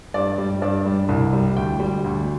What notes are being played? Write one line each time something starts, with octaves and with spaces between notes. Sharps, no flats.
G2 D5
G3
G2 D5
G3
C2
G3
D2 G5
G3
D2